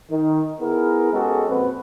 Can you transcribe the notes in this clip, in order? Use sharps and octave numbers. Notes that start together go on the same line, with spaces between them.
D#3
B3 E4 G#4 A#4
G#3 B3 C#4 F#4 G4 A4
F2 A#2 C4 F#4 B4